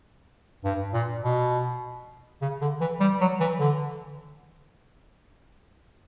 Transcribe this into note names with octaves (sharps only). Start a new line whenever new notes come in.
G2
A#2
B2
C#3
D3
E3
G3
F#3
E3
D3